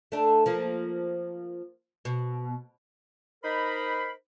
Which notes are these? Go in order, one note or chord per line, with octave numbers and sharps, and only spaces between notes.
A3 D4
F3 A#3
B2
D#4 A#4 C5 B5